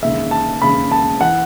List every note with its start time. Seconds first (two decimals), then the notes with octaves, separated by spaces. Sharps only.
0.02 E1 D#2 C#3 E5
0.31 A5
0.62 E1 D#2 C#3 B5
0.91 A5
1.21 E3 F#5